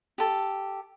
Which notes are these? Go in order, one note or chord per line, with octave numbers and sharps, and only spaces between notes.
G4 A4